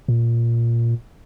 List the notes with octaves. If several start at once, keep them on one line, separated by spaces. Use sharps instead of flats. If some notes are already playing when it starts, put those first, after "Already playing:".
A#2